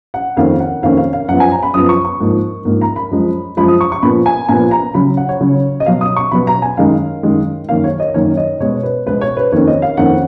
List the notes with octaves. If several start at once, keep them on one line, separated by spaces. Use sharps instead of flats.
F#5
F2 D#3 A#3 C#4 F5
F#5
F2 D#3 A#3 C#4 F5
F5
F5
F#2 F3 B3 F#5
G#5
A#5
B5
F#2 F3 B3 D#6
C#6
C#6
G#2 F3 A#3
G#2 F3 A#3
A#5
B5
F#2 F3 G#3
F#2 F3 G#3 B5
D#6
C#6
C#6
A#2 F3 B3 B5
G#5
A#2 F3 B3 G#5
A#5
C#3 F#3 C#4 B5
F#5
C#5
C#3 F#3 C#4
D#5
B2 F#3 B3 F5
D#6
C#6
B2 F#3 B3 B5
A#5
G#5
F#2 D#3 G#3 F5
F#2 D#3 G#3
F#2 D#3 A#3 C#4 F5
C#5
D#5
F#2 D#3 A#3 C#4 C#5
D#5
B2 G#3 B3 C#5
B4
B2 G#3 B3 B4
C#5
B4
F2 D#3 A#3 C#4 C#5
D#5
F5
F2 D#3 A#3 C#4 F#5